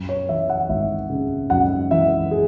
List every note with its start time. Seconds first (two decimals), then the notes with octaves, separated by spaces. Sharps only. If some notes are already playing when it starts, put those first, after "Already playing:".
Already playing: F#2
0.09 C#5
0.29 E3 E5
0.49 F#5
0.69 G#1 E5
1.10 C#3
1.50 F#2 F#5
1.91 E3 E5
2.31 G#4